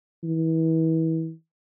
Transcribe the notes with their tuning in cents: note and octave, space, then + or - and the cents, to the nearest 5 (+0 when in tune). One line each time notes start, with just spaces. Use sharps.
E3 -30